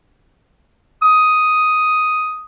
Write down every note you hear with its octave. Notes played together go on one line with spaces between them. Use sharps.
D#6